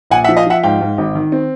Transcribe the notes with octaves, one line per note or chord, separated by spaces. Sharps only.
A#1 F#5 G#5
E5 F#5
F3
D#5 F5
F3 E5 F#5
G#2 F5 G5
G#2
G#1
D#3
C4